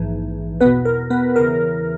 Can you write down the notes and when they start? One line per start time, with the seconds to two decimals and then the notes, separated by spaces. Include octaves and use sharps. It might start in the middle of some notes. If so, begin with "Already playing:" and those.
Already playing: A#1 G#2 E3
0.61 E2 B3 B4
0.65 B2
0.85 A#4
1.10 B3 B4
1.36 E2 C#3 E3 A#4